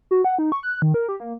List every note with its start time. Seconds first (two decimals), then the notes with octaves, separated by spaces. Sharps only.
0.11 F#4
0.24 F#5
0.39 D#4
0.52 C#6
0.63 F#6
0.82 D#3
0.94 A#4
1.09 G4
1.20 A#3